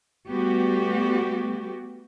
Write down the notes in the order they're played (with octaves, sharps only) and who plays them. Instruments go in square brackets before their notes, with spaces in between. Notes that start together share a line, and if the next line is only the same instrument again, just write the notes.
[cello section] G3 A3 B3 F#4 G4